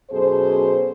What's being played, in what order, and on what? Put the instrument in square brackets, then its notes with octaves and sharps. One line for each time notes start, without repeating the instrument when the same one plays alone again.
[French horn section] F#2 B2 G#4 A4 C5